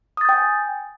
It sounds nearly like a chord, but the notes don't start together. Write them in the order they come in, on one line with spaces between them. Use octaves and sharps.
D#6 A6 G6 G5 G#5